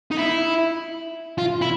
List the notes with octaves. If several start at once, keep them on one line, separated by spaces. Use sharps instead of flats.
D#4
E4
F4
E4